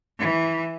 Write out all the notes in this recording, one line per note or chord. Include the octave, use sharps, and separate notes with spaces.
E3